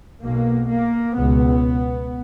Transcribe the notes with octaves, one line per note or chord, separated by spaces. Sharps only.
B1 B2 A#3
A#3
C#2 B2 B3